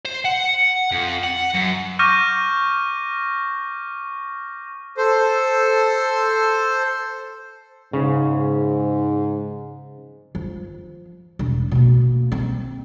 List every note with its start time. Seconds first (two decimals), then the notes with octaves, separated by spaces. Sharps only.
0.05 C5
0.25 F#5
0.91 F2
1.23 F#5
1.54 F#2
1.99 C#6 D6 F6 G6 A#6 D#7
4.98 A4 C5
7.93 G#2 C#3
10.35 F3
11.39 E1
11.71 B2 A#3
12.32 C4